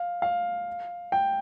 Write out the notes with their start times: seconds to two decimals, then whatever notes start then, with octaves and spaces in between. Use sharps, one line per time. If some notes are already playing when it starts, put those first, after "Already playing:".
Already playing: F5
0.22 F5
1.12 G5